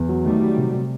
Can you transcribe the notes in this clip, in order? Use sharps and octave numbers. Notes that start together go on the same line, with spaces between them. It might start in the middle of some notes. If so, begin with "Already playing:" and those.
Already playing: E2
F#3
D#3 G3 A3
F#3
C3
C3